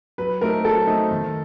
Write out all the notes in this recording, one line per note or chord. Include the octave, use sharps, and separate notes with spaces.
F#3 B4
A3 C4 D#4 A#4
F#3 A4
A3 C4 D#4
D#3